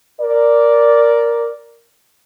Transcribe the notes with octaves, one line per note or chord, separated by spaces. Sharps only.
A#4 D5